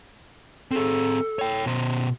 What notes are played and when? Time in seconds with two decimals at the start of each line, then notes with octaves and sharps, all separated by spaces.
0.71 C4 G#4 A4
1.39 C#5 G5
1.66 B2 C5